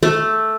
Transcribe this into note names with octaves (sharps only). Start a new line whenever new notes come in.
A3